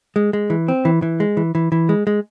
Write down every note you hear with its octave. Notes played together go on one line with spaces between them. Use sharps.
G#3
G#3
E3
C4
E3
E3
G#3
E3
E3
E3
G#3
G#3